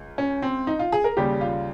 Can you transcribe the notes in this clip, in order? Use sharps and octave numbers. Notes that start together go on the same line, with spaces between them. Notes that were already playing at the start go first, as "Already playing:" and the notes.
Already playing: C#2
C#4
C4
D#4
F4
G#4
A#4
D#2 C#3 G3 G4
F4